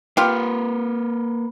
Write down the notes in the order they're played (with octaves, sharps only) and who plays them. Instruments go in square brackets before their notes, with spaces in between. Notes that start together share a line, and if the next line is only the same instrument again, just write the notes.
[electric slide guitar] A#3 B4 [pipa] F4 G4